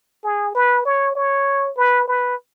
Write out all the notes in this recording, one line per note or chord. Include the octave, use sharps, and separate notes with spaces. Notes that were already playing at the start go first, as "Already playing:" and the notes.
G#4
B4
C#5
C#5
B4
B4